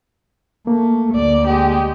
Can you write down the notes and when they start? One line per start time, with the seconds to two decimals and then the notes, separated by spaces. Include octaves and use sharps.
0.67 A3 A#3
1.15 D2 D5
1.47 G#3 G4